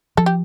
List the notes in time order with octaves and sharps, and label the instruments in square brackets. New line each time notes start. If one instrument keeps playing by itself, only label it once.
[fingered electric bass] F3 [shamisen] A4
[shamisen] G4